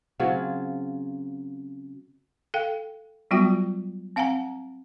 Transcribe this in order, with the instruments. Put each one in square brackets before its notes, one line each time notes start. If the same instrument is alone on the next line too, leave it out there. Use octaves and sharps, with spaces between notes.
[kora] C#3 F#3 C4 F4
[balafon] A4 F5 G5
F#3 G3 B3 F4 F#4 G5
C4 F5 F#5 G#5 A#5